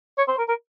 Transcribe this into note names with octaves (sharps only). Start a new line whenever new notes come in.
C#5
C5
A#4
A#4